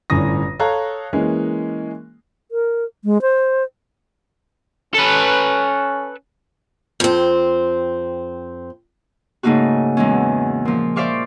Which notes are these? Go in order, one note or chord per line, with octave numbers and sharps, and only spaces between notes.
G1 A2 D3 C#4 D#6 A#6
A4 C#5 F5 A#5 F#6
E3 G#3 A#3 C#4
A#4
G#3
C5
C#4 A4 B4
F2 C4
G#2 C#3 A3 A#3 D#4 F#4
E2 E3 G#3 C#4
A#2 F3
C5 D5 E5 F5 C#6 D6